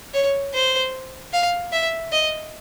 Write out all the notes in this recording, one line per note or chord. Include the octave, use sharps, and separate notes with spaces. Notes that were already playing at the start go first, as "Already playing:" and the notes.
C#5
C5
F5
E5
D#5